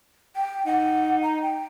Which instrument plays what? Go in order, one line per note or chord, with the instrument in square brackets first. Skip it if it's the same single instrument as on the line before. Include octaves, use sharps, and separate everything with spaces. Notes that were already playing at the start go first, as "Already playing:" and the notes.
[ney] G5
[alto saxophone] D#4 [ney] F#5
[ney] A#5
G5